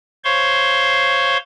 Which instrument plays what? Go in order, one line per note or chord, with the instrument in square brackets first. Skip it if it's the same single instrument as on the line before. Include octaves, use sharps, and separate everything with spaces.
[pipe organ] C5 C#5 F5 C6 C#6